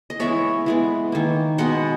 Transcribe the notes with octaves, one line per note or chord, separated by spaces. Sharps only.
D#5
E3 G#3 B3 C#5 E5
E3 G#3 B3
D#3 A#3
B2 G#3 B3 D#5 F#5